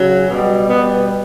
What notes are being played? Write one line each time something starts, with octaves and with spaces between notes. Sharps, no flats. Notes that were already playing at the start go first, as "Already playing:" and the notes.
Already playing: C#3 F#3
B2 G3
B2 G3 B3